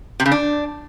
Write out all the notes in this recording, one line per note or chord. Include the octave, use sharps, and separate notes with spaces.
C3
C#3
D4